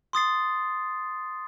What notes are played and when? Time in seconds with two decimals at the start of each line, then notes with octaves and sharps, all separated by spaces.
0.13 C6 D#6 A6 C7